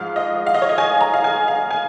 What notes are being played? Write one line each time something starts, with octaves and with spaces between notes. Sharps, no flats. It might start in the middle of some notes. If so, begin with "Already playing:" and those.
Already playing: G#2 F3 F5
D#5
F5
D#5
C#5
D#5
G#5
A#5
F5
G#5
F5
G#5